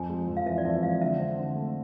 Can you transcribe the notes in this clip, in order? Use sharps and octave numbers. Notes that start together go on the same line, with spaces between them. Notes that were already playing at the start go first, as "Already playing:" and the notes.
Already playing: F2 G#5
G#3
F2
F5
E3 E5
D5
F2 E5
G#3 F5
D3 E5
C4
D3
A3